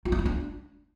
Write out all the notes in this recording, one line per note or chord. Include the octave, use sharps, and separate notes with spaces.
F4
D4
F4
D4